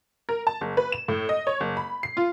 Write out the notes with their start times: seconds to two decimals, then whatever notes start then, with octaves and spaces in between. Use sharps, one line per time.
0.29 A#4
0.47 A5
0.61 F#1
0.77 B4
0.92 E7
1.08 A2
1.29 D#5
1.47 C#5
1.60 F#1
1.77 B5
2.03 C7
2.17 F4